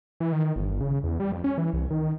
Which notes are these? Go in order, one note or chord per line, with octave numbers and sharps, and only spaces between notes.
E3
D#3
G1
C#3
E2
G3
F2
C#4
E3
C2
D#3